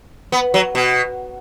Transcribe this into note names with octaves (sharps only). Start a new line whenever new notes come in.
B3
F#3
B2